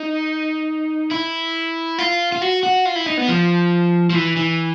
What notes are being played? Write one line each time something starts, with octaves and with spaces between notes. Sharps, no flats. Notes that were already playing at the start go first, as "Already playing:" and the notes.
Already playing: D#4
E4
F4
F4
F#4
F#4
F4
E4
D#4
B3
F3
F3
E3
E3